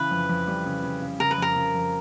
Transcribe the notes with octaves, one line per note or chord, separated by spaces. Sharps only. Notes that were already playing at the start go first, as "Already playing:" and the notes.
Already playing: C#3 E3 B4
F2
F2
G3
C#3
C#3
C#3
C#3 A#4
B4
F2 A#4
C#3
F2